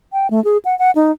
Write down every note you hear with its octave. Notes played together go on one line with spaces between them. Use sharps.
G5
A3
G#4
F#5
F#5
D#4